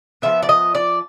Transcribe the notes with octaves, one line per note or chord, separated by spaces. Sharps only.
F3 G#3 B3 E5
D5
D#5
D5